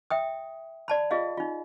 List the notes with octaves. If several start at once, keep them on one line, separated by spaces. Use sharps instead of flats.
E5 G5 D#6
D5 A5 B5
F4 G#4 D#5 F5
D#4 F4